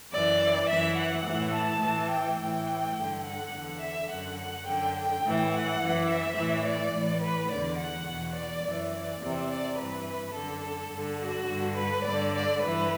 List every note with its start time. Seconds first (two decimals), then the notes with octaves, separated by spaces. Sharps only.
0.11 F#2 E3 D5
0.68 F#2 E3 E5
0.97 F#5
1.25 A2 E3
1.54 A5
1.82 A2 E3
2.11 G5
2.39 A2 E3 G5
2.96 G2 D3
3.24 F#5
3.52 E2 D3
3.80 E5
4.09 F#2 D3 F#5
4.38 F#5
4.66 F#2 D3 G5
4.95 G5
5.22 A2
5.27 E3
5.51 F#5
5.80 F#2 E3
6.08 E5
6.36 A2 E3
6.65 D5
6.93 A2 E3
7.22 B4
7.50 E2 D3 D5
7.79 F#5
8.07 E2 B2
8.36 D5
8.64 F#2 E3
8.92 D5
9.21 E2 C3 E3
9.49 D5
9.77 G2 E3 B4
10.34 F#2 D3 A4
10.91 G2 D3
11.19 F#4
11.48 G2 D3
11.77 B4
12.04 G2 D3 D5
12.33 D5
12.61 G2 E3 B4